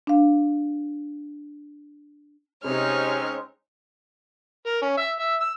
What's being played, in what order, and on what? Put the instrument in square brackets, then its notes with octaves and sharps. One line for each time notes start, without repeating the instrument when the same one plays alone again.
[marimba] D4 F5
[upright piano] C3 [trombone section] G#3 C4 C#4 [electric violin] D#4 F6 [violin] C#5
[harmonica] A#4
C#4
E5
E5
E6